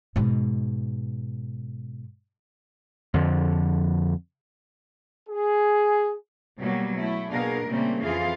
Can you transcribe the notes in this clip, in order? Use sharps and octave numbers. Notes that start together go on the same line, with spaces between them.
G#2 B2
F2 D3 F3
G#4
B2 F#3 G3 A#3
A3 E4
B2 A#3 D4 G#4 A#4 F5
A#2 C#3 G3 A3 A#3 C4
F2 E3 F4 G#4 F5